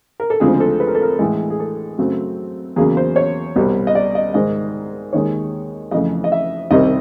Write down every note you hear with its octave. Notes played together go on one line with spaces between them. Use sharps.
A#4
A4
D2 C#3 F3 G#3 C4 G#4
A4
B4
A#4
A4
A#4
A2 E3 G#3
G#4
A4
F#2 C#3 F#3 A3 C4
E2 C#3 F#3 A#3 G#4
C5
C#5
C2 B2 G3
D#5
D5
D#5
G#2 D#3 G#3 D#5
D#2 D#3 G#3 C#5
F2 C#3 E3 A3 D#5
D#5
E5
C2 C3 D#3 G3 C4 D#5